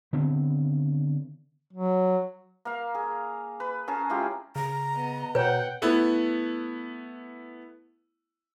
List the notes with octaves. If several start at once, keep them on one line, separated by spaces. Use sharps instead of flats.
D3 D#3 B3 C4
F#3
A#3 F5
G#4
B4
C#4 G#4 A#4 A5
G#3 E4 F4 G4
C#3 A#5
B3 D#5
B2 B4 C#5 F#5 G5
A3 B3 E4